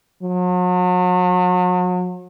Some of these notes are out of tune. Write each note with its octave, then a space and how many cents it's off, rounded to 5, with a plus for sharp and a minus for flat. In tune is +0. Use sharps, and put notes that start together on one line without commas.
F#3 -40